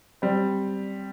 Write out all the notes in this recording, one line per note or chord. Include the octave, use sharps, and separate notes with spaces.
G3 C4